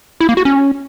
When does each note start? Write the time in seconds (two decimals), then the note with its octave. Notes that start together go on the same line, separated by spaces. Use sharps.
0.20 E4
0.29 A#3
0.37 F#4
0.45 C#4